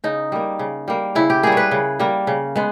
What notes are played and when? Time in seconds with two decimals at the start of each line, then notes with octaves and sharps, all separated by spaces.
0.04 C#3 D#4
0.32 G3 A#3
0.59 C#3
0.88 G3 A#3
1.15 C#3 E4
1.30 G4
1.43 G3 A#3 G#4
1.52 B4 C#5
1.71 C#3
1.99 G3 A#3
2.27 C#3
2.56 G#3 B3